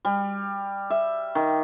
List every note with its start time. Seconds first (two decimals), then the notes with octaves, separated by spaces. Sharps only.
0.05 G3
0.90 E5
1.35 D#3